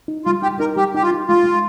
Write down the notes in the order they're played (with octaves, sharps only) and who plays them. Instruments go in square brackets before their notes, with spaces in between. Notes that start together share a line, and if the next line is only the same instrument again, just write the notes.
[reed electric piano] D#4
[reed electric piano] G3 [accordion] F4
[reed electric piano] D#4 [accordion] G4
[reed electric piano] D#4 [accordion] A#4
[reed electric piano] G3 [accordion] G4
[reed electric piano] D#4 [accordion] G4
[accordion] F4
[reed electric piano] D#4
[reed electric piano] G#3 [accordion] F4
[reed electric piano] G#3